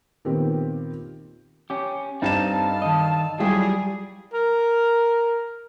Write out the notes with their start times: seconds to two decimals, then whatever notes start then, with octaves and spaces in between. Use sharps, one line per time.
0.25 A#2 D#3 B3 C4 G4
1.70 C#4 G4
2.22 G2 C4 D#4 A4 F5 A5 A6 E7
2.82 D#3 D#5
3.40 F#3 G3 E4 F4 G#4 G5
4.34 A#4